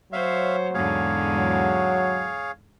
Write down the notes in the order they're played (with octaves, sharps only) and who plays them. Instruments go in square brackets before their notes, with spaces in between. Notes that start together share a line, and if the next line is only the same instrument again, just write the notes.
[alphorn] F#3 [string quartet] C5 C#5 [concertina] E5 F5
[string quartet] E2 G#2 D3 [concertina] G#4 C#5 F5
[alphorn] F#3